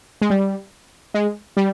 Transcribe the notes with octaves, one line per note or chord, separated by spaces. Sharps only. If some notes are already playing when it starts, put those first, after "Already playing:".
G#3
G3
G#3
G3